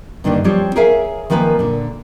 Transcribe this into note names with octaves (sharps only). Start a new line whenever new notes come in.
G2 D3 D#3 A#3 D4
F3 G3 C4 F4 G4 C#5
G#4 A#4 C#5 E5 F5 G#5
D#3 F3 A#3 B4 G#5
A#2 D3